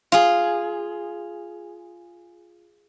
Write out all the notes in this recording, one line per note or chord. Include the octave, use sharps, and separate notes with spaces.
F4 G#4